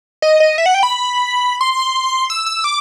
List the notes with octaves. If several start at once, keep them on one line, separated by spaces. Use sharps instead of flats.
D#5
D#5
E5
F#5
G5
B5
C6
E6
E6
D6